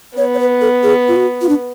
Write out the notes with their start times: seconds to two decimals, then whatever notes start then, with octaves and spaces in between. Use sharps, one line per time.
0.17 B3 C#5
0.34 C#5
0.39 B4
0.61 A4
0.83 G#4
1.08 F4
1.16 F#4
1.42 F4
1.49 D4